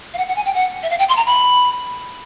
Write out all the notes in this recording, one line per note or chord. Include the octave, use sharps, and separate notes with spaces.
F5
F#5
F#5
G#5
G5
F#5
E5
F5
G5
C6
A#5
B5